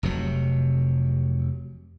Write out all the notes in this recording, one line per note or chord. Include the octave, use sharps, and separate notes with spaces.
F1 C3 F#3